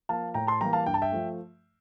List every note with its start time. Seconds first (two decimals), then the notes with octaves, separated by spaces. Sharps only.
0.09 F3 A#3 F5 A5
0.34 A2 G5 A#5
0.47 A5 C6
0.60 E3 G3 A#3 G5 A#5
0.73 F5 A5
0.86 G2 G5
0.94 A5
1.02 E5 G5
1.12 F3 A3